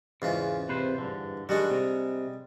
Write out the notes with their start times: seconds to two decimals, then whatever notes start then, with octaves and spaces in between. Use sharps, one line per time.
0.22 E2 G#2 C#3 F4
0.69 C3 B4 C5
0.98 G2 D3
1.49 D3 D#3 G3 G#3 D4 F#4
1.70 C3